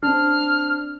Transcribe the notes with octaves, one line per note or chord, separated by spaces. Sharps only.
C4 D4 F6